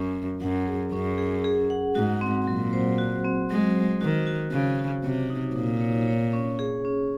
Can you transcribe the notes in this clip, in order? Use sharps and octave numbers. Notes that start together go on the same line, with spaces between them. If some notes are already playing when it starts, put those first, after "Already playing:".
Already playing: F#2 C#4
C#4
F#2 F#5
G#4
F#2 C#4
G#4
G#4
F#5
G#2 F#4
C4
A#2 F#3
C5
F#4
C4
F#3 G#3
C5
D#3 F#4
F#4
C#3 F#4
F#4
C3 C#5
D#4
A#2 D#4
C#5
C#5
C#4
G#4
C#4